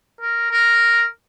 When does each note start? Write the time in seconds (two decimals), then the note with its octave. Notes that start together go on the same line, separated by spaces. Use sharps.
0.21 A#4
0.51 A#4